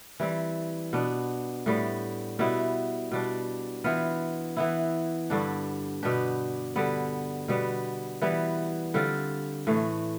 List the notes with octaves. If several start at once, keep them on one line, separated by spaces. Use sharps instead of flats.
E3 G3 C4
B2 B3 D4
A2 G3 B3
B2 G3 B3 E4
B2 G3 D4
E3 B3 F4
E3 B3 E4
G2 D3 G3 D4
B2 B3 D4 G4
D3 G3 B3
B2 G3 B3
E3 G3 B3
D3 G3 C4 F4
A2 E3 A3